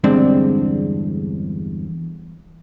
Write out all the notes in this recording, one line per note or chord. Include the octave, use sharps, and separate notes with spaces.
E2 G2 D3 G#3 C4 D4